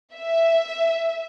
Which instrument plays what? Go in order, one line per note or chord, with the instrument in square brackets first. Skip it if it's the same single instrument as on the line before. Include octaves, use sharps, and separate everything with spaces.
[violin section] E5